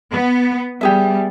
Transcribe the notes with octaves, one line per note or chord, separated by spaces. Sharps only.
B3
G3 B3 G4 G#4 E5